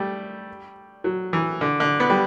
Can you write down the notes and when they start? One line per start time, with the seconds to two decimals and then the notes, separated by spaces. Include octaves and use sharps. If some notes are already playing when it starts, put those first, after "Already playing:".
Already playing: G3 A3
1.04 F#3
1.33 E3
1.61 D3
1.80 D3
2.00 B3
2.10 G3